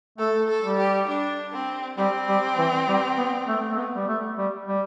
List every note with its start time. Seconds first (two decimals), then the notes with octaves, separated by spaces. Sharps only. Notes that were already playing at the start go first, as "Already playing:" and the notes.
0.18 A3 A4
0.49 A4
0.63 G3
0.77 G4
1.08 D4
1.52 C4
1.97 G3 C4
2.28 G3
2.58 E3
2.88 G3
3.18 B3
3.48 A3
3.71 A3
3.77 B3
3.96 G3
4.08 A3
4.38 G3
4.68 G3